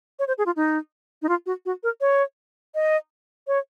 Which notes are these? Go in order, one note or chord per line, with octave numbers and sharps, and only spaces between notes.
C#5
C5
G#4
F4
D#4
D#4
F4
F#4
F#4
A#4
C#5
D#5
C#5